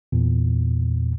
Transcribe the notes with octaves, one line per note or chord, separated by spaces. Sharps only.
E2 A#2